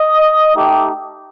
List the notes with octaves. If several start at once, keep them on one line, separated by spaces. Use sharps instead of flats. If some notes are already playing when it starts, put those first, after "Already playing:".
Already playing: D#5
A3 D#4 G4